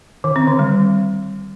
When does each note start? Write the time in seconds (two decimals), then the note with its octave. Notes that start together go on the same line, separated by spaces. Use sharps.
0.24 D#3
0.36 C4
0.47 D3
0.59 G3